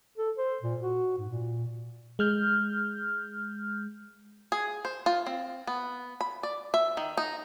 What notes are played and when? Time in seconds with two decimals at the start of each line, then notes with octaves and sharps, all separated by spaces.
0.18 A4
0.38 C5
0.63 A#2
0.81 F#4
1.18 G#2
1.30 A#2
2.19 G#3 F6 G6
4.52 G#4
4.85 C5
5.06 F4
5.26 C4
5.67 B3
6.21 B5
6.43 D5
6.74 E5
6.97 D#3
7.17 D#4